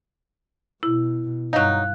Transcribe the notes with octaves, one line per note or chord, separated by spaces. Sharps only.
B2 E4
G2 F#3 D#4 F5 F#6